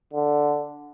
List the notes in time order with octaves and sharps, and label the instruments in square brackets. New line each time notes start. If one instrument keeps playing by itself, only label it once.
[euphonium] D3